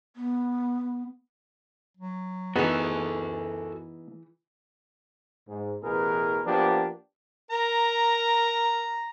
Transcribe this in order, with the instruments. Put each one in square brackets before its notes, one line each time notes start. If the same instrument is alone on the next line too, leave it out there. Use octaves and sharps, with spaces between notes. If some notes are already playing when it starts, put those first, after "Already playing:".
[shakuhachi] B3
[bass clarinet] F#3
[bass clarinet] F#2 [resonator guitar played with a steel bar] E3 G#4 [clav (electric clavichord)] B3 D#4 [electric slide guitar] F#4 A4
[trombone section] G#2
A1 B2 E3 G#4 A#4 B4
F3 A#3 B3 D4 G4
[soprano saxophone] A#4 [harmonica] A#5